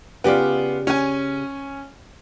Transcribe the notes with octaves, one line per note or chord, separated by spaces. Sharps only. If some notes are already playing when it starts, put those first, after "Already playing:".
C#3 B3 F4 G4 D5
C#4 G#5